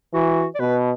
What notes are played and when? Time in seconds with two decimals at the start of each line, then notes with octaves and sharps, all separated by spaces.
0.14 E3 F#4
0.55 D5
0.60 B2 B4